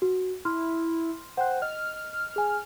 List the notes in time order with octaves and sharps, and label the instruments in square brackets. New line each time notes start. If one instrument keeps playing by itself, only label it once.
[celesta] F#4
[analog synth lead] E4 [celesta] C6 F6
[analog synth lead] C5 [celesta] F#5 G5 F#6
[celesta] D#5 [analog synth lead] F6
[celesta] G#4 G#5